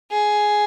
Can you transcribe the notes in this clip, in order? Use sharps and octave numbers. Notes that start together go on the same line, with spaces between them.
G#4